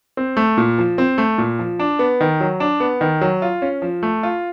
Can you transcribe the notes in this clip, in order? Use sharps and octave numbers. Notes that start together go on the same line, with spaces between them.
C4
A3
A#2
F3
C4
A3
A#2
F3
D4
B3
D#3
F#3
D4
B3
D#3
F#3
F4
C#4
F3
A3
F4